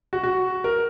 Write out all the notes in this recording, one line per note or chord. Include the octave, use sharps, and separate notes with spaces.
F#4
F#4
A#4